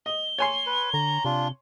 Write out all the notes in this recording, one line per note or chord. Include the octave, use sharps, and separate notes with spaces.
D#5 G7
C#5 G#5 C6
B4
D3 A#5
C3 D4 F4